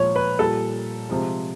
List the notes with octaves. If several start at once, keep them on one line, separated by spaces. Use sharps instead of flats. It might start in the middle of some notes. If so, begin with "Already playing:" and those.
Already playing: A#2 F3 G#3 C#5
B4
A#2 G3 A4
C3 F3 G#3